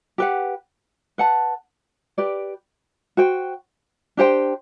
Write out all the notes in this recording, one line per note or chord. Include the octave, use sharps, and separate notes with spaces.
G4 B4 F#5
B4 F#5 A5
G4 B4 D5
F#4 C5 G5
D4 G4 C5 G5